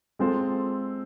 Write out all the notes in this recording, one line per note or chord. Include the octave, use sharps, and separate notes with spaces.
G#3 C4 F4 A4 C5